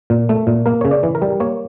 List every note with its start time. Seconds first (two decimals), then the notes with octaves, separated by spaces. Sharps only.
0.10 A#2
0.29 A3
0.47 A#2
0.66 A#3 A#4
0.81 C#3 C#5
0.91 D5
1.03 E3
1.15 A#4
1.22 G3
1.40 A#3 C#5